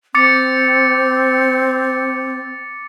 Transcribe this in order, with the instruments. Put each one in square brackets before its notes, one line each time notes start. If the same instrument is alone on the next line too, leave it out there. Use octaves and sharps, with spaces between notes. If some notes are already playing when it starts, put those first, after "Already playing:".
[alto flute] C4 [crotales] D6 A6 C#7